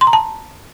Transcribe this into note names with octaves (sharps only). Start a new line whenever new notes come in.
C6
A#5
A5